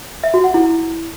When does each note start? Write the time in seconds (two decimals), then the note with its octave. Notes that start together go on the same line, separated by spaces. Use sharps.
0.24 E5
0.34 F#4
0.44 F#5
0.54 E4